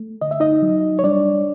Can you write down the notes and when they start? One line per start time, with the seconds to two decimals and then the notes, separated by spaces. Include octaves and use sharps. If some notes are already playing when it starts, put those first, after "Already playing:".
Already playing: A3
0.21 D3 D#5
0.31 E5
0.40 D#4 D#5
0.62 F#3
0.99 C#5
1.03 G3 D4 D5